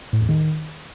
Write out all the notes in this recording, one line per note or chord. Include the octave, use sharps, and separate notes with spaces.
A2
E2
D#3